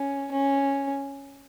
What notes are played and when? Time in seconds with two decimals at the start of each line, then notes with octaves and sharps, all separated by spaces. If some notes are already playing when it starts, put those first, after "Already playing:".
Already playing: C#4
0.32 C#4